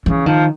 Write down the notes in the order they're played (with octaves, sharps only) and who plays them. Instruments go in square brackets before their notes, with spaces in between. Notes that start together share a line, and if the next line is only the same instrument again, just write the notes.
[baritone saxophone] C#3 [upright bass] E3
[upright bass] D#3 [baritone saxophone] F3